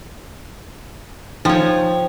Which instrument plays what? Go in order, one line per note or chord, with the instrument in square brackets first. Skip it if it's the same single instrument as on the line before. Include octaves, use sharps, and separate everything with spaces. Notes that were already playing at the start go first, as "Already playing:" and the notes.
[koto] F3 C#5 [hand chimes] D#4 G5